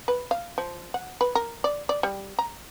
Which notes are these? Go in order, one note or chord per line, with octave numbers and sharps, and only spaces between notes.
B4
F5
F3
F#5
B4
A#4
D5
D5
G3
A#5